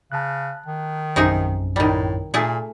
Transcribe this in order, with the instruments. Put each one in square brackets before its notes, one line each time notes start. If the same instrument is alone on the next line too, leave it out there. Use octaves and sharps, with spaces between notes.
[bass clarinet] C#3 [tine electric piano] A5 F#6
[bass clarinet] D#3
[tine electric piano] A#1 F#2 [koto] C3 D#4 G#4
[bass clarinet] A2 [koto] D#3 G3
[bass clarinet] A#2 [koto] A3 G#4